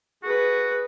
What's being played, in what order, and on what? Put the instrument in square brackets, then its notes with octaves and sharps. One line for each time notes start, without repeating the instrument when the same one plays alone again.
[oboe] F#4 [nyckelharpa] G#4 B4